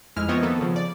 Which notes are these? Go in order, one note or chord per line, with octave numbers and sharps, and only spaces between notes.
F2 G#3 E4 F6
F3 B3 C4 C#5 D#5
D#3 A#3 B3 A4
C#3 F3
D5